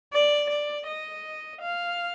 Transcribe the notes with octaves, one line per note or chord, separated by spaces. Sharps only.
D5
D5
D#5
F5